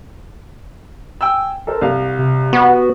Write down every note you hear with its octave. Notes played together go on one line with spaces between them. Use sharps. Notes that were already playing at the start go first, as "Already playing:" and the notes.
G5 G#5 E6
A4 A#4 C5
C2 F5
C3
B3 F#4